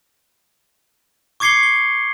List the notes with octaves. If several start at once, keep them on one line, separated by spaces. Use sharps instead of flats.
C#6 D6 G#6 C7 C#7 G7
G7